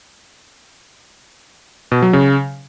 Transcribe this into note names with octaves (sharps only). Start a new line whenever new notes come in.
B2
F#3
C#3